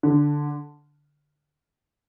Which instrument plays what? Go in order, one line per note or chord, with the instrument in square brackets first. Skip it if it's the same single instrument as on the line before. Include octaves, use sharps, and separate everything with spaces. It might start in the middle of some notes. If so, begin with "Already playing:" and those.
[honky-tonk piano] D3